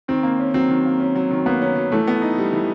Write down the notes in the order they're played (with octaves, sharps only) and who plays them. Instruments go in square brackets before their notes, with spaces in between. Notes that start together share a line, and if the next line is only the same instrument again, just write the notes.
[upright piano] D#3 [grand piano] C4
[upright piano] A#3
C#4
[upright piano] F#3 [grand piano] C4
[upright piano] D#3
A#3
C#4
F#3
D#3
[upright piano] A#3 [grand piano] B3
[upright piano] C#4
F#3
[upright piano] E3 [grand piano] A3
[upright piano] B3
D#4
G3
E3